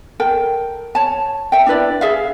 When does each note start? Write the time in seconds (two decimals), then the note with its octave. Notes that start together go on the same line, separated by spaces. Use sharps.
0.20 A4 A#4 G5
0.95 C#5 A5
1.52 E5 G5
1.66 D4 E4 B4 D5
2.01 G#4 E5 F5